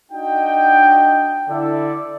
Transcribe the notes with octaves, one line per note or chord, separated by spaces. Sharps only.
D4 D#4 F#4 D#5 G5
D3 E4 A4 D5